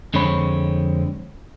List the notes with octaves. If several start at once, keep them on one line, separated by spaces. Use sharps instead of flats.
F2 D3 G#3 C4 C#5 B5